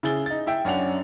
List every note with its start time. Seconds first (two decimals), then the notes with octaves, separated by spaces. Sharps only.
0.03 C#3 E4 G#4 A6 G7
0.26 D#4 A6
0.47 E4 E5 G5
0.65 F#2 C#4 D4 F#5 F7